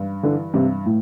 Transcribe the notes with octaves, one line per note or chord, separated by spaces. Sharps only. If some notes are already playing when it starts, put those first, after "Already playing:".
Already playing: G2
D3 E3
G2 C3
A2